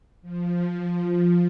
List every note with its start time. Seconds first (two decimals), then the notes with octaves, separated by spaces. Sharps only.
0.22 F3